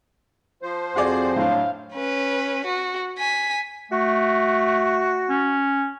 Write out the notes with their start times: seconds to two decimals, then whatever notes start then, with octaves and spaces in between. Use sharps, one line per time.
0.62 F3 C5
0.96 F2 C4 F#4 G#4 D5
1.36 A2 F#3 D4 F5
1.93 C#4 B4
2.66 F#4
3.18 G#5 B6
3.92 A3 F#4
5.29 C#4